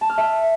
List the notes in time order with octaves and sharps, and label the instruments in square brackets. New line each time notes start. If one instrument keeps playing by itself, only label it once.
[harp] A5
F6
E5